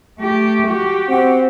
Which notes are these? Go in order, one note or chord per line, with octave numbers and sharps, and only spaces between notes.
A3 G4
F#4 G4
C4 F#5